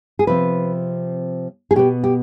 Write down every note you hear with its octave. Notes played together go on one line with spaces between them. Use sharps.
G#4
C3 F3 C4 B4
G#4
B2 B3 G4
G4